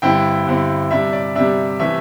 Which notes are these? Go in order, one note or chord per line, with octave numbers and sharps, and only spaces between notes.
G2 D3 C4 E4 G5
G2 D3 C4 E4
C3 G3 D4 E5
D5
C3 G3 D4 E5
C3 E3 A3 E5